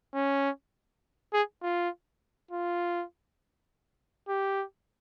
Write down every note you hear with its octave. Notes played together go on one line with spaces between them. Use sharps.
C#4
G#4
F4
F4
G4